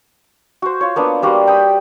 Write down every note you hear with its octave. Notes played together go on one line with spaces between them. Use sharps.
F#4 C5
F4 C#5
A#3 B3 D4
G3 A#3 F#4 C5
G5 B5 D#6